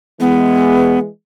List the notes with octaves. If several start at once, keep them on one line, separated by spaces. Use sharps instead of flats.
E3 G#3 B3